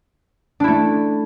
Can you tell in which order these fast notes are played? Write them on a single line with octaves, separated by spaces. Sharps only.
D4 E4 A3